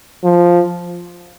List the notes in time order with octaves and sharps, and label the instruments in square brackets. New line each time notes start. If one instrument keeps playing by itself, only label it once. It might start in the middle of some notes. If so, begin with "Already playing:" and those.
[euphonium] F3